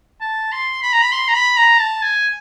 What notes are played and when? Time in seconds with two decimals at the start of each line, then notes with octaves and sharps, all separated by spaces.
0.21 A5
0.52 C6
0.82 B5
0.93 A#5
1.02 B5
1.12 C6
1.28 A#5
1.35 B5
1.57 A#5
1.80 A5
2.03 G#5